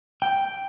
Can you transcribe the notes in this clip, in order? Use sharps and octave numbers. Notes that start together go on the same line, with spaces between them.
G5